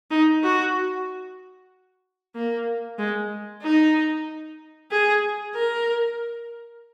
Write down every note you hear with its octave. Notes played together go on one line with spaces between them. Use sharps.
D#4
F#4
A#3
G#3
D#4
G#4
A#4